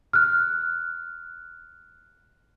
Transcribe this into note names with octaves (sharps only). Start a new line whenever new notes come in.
F6 F#6